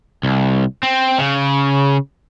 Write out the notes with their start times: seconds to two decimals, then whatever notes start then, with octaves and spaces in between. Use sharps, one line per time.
0.23 C2
0.83 C4
1.19 C#3